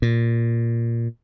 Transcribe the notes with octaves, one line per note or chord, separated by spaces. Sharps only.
A#2